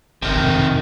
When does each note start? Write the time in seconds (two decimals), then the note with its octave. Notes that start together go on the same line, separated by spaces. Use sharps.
0.22 G1 C3 D#3
0.36 F2 B2 F3